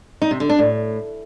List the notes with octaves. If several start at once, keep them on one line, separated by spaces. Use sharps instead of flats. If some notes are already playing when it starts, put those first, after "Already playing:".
D#4
C3
D3
D4
A2